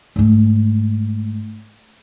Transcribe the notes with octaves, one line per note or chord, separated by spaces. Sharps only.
G#2 A3